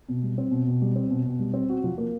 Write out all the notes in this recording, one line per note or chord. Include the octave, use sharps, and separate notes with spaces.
B2
G3
C4
B2
B2
G3
C4
B2
B2
G3
C4
F#4
F3
A#3